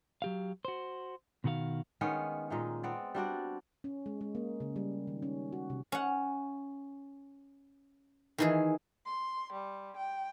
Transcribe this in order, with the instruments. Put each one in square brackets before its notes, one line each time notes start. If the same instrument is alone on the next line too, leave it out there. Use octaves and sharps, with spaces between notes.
[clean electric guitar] F#3 G4 F5
F#4 C5
B2 D#3 F#4 G#4 F5
[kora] D#3 G#3 B3 C#4
A#2 G#3 D#4
B3 C4 D5
G3 D4 F#4 D5
[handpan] C#4
G#3
G#3
A#3
C#3
G3
D#3
C#4
F#4
C3
[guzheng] C#4 F#5
D#3 E3 G#4
[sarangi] C6
G3
G5